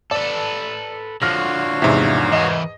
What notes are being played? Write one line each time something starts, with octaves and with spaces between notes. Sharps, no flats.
A4 B4 D5
D3 F3 F#4 C#5 F5 F6 A#6
E2 G#2 C3 E5
E3 A#4 D#5